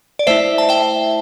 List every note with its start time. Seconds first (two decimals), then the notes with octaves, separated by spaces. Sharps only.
0.19 D5
0.27 A3 E4 C5 E5
0.58 A5
0.69 E5 G5